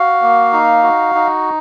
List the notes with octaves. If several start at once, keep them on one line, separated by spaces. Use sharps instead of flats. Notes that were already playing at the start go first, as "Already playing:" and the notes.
Already playing: F#4 F5
A#3
D#4
F#4
D#4